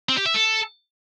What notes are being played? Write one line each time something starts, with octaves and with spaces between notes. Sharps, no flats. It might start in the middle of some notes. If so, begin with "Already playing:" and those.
C4
G4
E5
A4